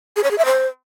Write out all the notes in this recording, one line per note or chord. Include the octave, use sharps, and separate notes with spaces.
G#4
C#5
G#4
E5
C5